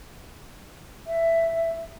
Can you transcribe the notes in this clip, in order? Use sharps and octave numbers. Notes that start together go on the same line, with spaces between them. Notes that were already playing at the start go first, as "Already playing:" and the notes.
E5